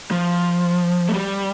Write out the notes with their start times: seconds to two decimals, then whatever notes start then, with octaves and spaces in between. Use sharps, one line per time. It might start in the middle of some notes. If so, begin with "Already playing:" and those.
0.11 F3
1.09 A3
1.13 G3